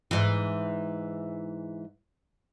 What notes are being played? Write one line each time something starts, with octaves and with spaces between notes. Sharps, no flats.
G#2 E3